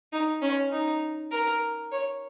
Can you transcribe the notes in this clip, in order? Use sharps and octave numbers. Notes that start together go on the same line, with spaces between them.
D#4
C#4
D#4
A#4
C#5